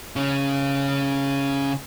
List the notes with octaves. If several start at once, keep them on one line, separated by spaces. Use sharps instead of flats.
C#3 C#4